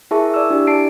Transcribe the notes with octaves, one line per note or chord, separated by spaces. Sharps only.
E4 G#4 A#4 E5 A5 C#6
D5 E6
D4 E4 G4
D5 A5 C7 D7